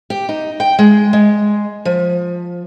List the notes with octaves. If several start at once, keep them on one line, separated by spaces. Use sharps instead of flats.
G4
D#4
G5
G#3
G#3
F3